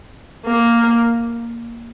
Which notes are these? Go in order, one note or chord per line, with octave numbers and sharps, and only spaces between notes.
A#3